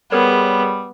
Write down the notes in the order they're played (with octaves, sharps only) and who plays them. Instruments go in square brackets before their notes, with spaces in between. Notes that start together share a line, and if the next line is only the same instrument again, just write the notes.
[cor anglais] G3 [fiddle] B3 [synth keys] G#4 A#4 C#5